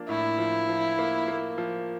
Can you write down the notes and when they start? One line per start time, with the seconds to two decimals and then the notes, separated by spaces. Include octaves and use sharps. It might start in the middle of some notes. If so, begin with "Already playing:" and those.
Already playing: F3 A#3 D4
0.09 A2 E4
0.38 F3
0.69 F3
0.99 A#3
1.28 A#3
1.58 F3